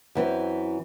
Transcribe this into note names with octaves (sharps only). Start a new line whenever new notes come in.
F#2 E3 C4